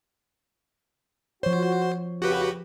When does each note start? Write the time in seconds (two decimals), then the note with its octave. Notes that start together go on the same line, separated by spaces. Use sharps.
1.43 F3 F#4 C5 C#5
2.22 F2 C#3 F#4 G4 B4